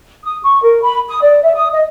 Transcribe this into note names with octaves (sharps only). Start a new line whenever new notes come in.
D#6
C#6
A#4
B5
D#6
D5
E5
D#6
D#5